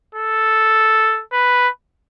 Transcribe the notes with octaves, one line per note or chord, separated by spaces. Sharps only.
A4
B4